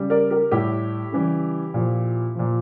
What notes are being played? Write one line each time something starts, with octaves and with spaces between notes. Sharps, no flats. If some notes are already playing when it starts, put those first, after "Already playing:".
Already playing: C#3 G3
A#4 D5
G4 A#4
A2 G3 E4 G4
C#3 E3 G3
A#2 F3
A#2 F3